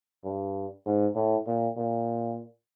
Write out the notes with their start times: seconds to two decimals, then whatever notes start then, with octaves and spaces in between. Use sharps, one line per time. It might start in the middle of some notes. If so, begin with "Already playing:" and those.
0.24 G2
0.86 G#2
1.15 A2
1.47 A#2
1.77 A#2